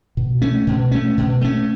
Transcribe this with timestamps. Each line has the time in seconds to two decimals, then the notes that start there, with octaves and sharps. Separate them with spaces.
0.17 B2
0.42 A3 C#4
0.67 B2
0.91 A3 C#4
1.17 B2
1.41 A3 C#4